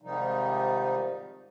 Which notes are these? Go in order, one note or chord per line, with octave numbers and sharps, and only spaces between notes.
G#2 C3 D#3 F3 G3 D#4